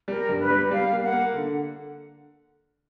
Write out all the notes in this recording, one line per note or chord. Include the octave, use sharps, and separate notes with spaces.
G3 A#4
G2
B4
G3
G3 F5
A#3
F#5
A#3
D3